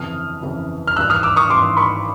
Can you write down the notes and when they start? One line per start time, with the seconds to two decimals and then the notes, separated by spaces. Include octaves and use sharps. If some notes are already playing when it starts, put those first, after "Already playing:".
Already playing: G1 F2 C#3 E3 D#6 F6
0.42 G1 F2 C#3 E3
0.87 F6
0.97 G#1 G2 E3 E6 F#6
1.10 D#6 F6
1.23 D6 E6
1.37 C#6 D#6
1.50 G#1 G2 E3 C6 D6
1.77 B5 C#6